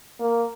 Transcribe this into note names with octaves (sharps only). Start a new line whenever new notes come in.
A#3